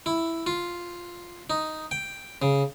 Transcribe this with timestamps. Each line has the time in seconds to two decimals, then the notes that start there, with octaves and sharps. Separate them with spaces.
0.06 E4
0.47 F4
1.50 D#4
1.91 G5
2.42 C#3